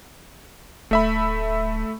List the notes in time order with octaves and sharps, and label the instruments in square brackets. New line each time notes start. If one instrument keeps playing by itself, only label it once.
[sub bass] D1 [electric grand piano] A3 E5 B5